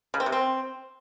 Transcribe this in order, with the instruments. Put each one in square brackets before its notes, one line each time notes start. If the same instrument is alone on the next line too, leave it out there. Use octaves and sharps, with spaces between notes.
[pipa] C#3
C4
C3
C4